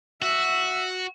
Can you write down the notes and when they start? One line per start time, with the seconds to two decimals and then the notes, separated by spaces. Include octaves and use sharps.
0.22 F#4 E5